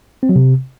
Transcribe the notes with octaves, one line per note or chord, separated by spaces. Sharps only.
C4
F#3
C3